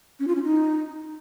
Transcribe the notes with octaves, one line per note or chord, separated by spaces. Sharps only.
C#4
F4
C#4
D#4